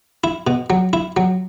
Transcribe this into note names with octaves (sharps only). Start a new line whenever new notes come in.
E4
B2
F#3
E4
F#3